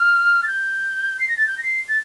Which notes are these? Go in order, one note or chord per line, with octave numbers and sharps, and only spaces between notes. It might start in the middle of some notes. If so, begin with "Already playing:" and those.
Already playing: F6
A6
G6
C7
A#6
A6
G6
A#6
C7
A6